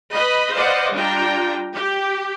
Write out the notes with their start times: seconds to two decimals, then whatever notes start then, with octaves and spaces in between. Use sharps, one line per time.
0.12 B4 D#5 B5
0.52 B4 C5 D5 D#5 F5 F#5
0.93 G3 D4 F4 G5 A#5
1.74 G4